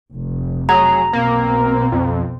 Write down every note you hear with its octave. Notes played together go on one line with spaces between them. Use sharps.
F1
F#3 G#4 A#5
B1 B2 A#3 C4
F2